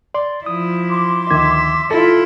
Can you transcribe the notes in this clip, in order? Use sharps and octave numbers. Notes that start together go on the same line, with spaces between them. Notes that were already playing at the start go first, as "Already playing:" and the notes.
D5 C6
F3 E4 D#6
C6 D6
D2 D#3 E5 G#6
E4 F4 A4